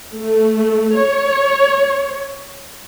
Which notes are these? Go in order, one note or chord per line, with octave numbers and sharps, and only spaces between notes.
A3
C#5